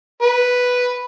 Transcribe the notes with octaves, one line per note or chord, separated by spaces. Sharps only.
B4